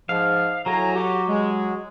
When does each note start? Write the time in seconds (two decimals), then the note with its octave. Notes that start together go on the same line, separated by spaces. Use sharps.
0.09 G#2 F3 F5
0.66 A2 F#3 G#5 A#5
0.95 F#4 G4
1.29 G#3